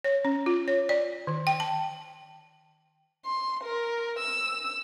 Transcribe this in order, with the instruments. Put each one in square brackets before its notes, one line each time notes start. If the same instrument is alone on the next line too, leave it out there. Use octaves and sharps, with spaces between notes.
[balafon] C#5
C#4
F4
C#5
D5
D#3
G5
A5
[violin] C6
A#4
E6